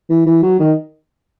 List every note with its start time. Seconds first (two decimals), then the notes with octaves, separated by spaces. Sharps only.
0.10 E3
0.26 E3
0.42 F#3
0.59 D#3